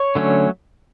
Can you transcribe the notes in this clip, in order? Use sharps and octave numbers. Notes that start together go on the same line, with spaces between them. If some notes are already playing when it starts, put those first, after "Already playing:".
Already playing: C#5
D3 F#3 A3 C#4